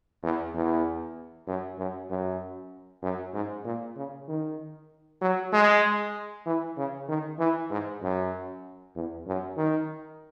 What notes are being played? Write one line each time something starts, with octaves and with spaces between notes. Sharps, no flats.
E2
E2
F#2
F#2
F#2
F#2
G#2
A#2
C#3
D#3
F#3
G#3
E3
C#3
D#3
E3
G#2
F#2
E2
F#2
D#3